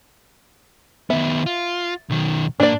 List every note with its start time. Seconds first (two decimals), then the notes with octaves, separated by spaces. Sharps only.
1.10 D#3 B3 E5
1.46 F4
2.10 B1 D#3
2.60 G#2 A#3 D4 D5